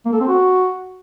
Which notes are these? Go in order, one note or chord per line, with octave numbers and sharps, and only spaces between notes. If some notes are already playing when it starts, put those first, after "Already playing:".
A#3
A4
C4
F#4